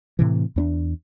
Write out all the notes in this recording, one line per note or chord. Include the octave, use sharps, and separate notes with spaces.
A2 C3 E3
E2 C4 D4